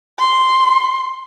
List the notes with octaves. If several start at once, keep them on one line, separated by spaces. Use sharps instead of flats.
C6